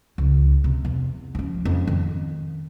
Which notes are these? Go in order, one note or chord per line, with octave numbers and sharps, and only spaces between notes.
C#2
C3
E2
F3 C#4
F2
D#3